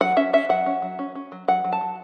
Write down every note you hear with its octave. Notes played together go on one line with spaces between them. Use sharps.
F#3 F#5
C#4 E5
C#4 E5
F#3 F#5
C#4
F#3
C#4
C#4
F#3
F#3 F#5
F#3
A5
F#3